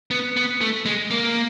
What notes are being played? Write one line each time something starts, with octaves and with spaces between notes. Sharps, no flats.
B3
B3
A3
G#3
A#3